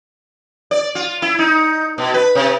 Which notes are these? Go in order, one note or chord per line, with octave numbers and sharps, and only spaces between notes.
D5
F4
E4
D#4
B2
B4
C3